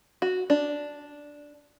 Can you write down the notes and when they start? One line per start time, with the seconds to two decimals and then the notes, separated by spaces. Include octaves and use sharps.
0.22 F#4
0.50 D4